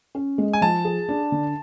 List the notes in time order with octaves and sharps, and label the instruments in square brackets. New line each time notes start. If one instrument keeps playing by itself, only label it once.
[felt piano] C#4
G#3
[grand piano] G#5
[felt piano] F3 [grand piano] A5
[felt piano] G#4
D4
D3